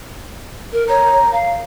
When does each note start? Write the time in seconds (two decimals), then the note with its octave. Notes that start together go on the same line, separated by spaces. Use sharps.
0.73 A#4
0.89 C#5 A#5
1.32 F5